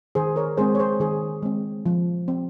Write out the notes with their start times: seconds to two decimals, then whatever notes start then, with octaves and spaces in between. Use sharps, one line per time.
0.15 D#3 G#4 C5
0.36 A#4 C#5
0.57 G#3 C4 G#4 C5
0.75 C#5
0.79 G#4 C5
1.00 D#3 G#4 C5
1.42 G#3 C4
1.86 F3
2.28 C4